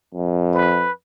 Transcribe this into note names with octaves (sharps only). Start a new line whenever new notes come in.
F2
B4